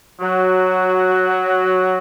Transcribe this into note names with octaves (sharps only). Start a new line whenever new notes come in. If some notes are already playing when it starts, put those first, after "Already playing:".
F#3 F#4